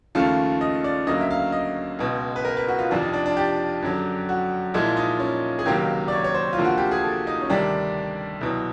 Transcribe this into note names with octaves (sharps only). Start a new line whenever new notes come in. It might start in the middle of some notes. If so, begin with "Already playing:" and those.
D#2 C#3 F3 A3 F5
D#5
D5
D2 C#3 F#3 A#3 D#5
E5
F5
D#5
C#2 B2 G#3
B4
A#4
B4
F#4
F4
F2 C3 F3 D4
D#4
D4
D4
G4
F#2 D3 F#3
F#4
A#2 F3 G#3 E4
D#4
C#4
G#4
C#2 C3 D#3 F#3 A#3 G4
D5
C#5
C#5
C5
F4
D2 C3 F3 A#3
F#4
G4
G#4
A4
D#4
C#4
D2 C3 D#3 G3 D4
C2 B2 F#3